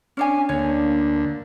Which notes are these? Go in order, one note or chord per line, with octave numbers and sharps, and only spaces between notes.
C#4 D4 G#5
D2 A#3 D4 C#5